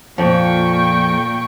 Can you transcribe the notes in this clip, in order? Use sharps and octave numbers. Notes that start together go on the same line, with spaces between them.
F2 A#2 G5 C#6